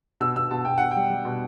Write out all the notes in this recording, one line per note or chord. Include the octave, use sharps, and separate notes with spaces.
B2 E6
B2 E6
B2 A5
B2 G5
B2 F#5
G3 G5
G3
B2